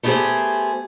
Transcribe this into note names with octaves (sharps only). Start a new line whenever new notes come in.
A3 B3 E4 G4 G#4 C5